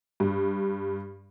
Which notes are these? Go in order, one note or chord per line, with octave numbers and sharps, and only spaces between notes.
G2